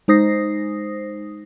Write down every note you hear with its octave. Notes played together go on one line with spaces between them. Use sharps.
G#3 D#4 C5 D#6 A#6 C7